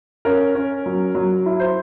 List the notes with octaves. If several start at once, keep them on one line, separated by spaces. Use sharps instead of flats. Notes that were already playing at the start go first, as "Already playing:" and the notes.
C#4 A#4
C#4
F#3
F#3
E4
C5